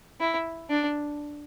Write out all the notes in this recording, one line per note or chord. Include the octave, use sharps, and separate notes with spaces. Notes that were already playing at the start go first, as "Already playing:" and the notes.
E4
D4